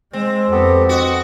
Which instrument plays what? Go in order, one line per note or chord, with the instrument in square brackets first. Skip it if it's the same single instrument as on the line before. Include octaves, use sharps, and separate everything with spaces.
[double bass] G#3 [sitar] C4
[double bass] F2 [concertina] B3 G4 A4
[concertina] C4 D#5 [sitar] F#4